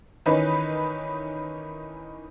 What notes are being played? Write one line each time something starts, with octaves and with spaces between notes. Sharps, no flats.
D#3 E3 C#4 D#4 B4